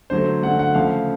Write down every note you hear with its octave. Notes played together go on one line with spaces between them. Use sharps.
D3 F#3 A3 C5
D3 F#3 A3 F#5
F#5
C#3 F3 A3 F5